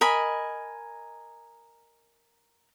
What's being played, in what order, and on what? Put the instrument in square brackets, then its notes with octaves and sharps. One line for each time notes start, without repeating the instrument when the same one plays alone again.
[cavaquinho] A#4 D#5 G#5 B5